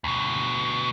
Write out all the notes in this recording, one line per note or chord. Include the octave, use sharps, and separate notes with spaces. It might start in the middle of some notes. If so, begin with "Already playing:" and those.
D2 B2